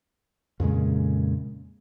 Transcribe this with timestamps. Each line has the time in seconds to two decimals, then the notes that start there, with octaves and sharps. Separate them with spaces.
0.60 F2 A#2 C#3 G#3